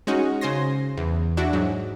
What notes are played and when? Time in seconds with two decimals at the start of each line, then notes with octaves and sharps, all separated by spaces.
0.07 G#3 C#4 D#4 F#4
0.41 C#3 C5 G#5 C6 A#6
0.97 E2
1.37 D4 E4 F#4
1.53 G#2 F#3